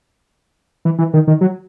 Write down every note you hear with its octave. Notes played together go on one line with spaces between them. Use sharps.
E3
E3
D#3
D#3
F#3